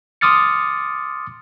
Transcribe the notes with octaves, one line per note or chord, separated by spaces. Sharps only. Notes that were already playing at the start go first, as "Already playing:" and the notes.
C6 D6 D#6 F6 A6 C#7